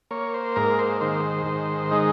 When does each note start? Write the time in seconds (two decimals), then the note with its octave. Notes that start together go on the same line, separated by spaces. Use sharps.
0.11 A#3 C#5
0.34 C5
0.56 G#2 A#4
0.79 C5
1.01 D#3 C5
1.46 G#2
1.91 G#3 D#4